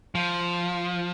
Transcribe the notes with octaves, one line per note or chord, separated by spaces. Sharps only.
F3